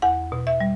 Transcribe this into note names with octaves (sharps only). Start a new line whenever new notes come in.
E2 F#5
B2
E5
G3